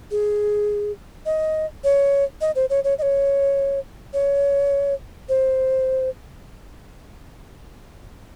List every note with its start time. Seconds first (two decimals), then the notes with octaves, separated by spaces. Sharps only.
0.11 G#4
1.26 D#5
1.84 C#5
2.41 D#5
2.56 C5
2.70 C#5
2.84 C#5
2.99 D#5
3.02 C#5
4.13 C#5
5.29 C5